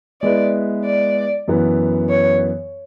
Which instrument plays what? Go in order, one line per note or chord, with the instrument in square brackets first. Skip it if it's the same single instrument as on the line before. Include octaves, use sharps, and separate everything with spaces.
[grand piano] G#3 B3 E4 B4 [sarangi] D5
[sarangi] D5
[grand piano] F#2 E3 B3
[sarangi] C#5